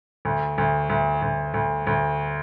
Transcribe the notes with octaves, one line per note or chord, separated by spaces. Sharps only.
D2
D2
D2
D2
D2
D2